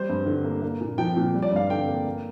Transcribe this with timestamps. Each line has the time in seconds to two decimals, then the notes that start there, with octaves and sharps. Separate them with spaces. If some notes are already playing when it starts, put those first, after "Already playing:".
Already playing: G3 C5
0.09 G2
0.26 D3
0.45 A#3
0.62 A#3
0.81 A#2
0.98 F3 G5
1.17 A#2
1.34 G3
1.42 D5
1.52 G2 F5
1.70 D3 G5
1.89 A#3
2.06 A#3